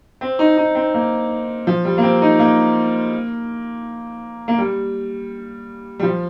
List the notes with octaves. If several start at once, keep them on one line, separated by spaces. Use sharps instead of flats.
C4
D#4
D#4
C4
A#3
F3
G3
A#3
C4
D#4
A#3
A#3
G3
G3
F3